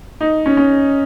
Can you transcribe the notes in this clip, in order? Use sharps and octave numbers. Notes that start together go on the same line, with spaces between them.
D#4
C#4
C#4